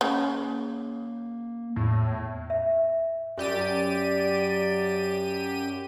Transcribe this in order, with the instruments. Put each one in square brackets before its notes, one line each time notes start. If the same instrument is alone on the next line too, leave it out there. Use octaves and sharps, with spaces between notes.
[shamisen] C#3 [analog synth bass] A#3
[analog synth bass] E2 [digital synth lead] A2
[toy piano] E5
[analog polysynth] F#2 G4 D#7 [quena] D5